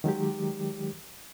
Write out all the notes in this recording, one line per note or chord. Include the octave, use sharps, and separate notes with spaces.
D#3 F#3 G#3 G4